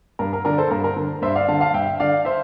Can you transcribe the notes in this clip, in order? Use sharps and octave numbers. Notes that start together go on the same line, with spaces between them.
G2 A#4
A#4
D3 A#4 D5
A4 C5
G2 A#4
A#4
D3
G2 C5 E5
D5 F5
D3 F5 A5
F5 A5
G2 E5 G5
D3 D5 F5
C5 E5